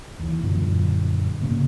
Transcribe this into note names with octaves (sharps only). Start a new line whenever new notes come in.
D#2 E3
F#2 A#2 D3 F3
G#2 C#3 A#3 C#4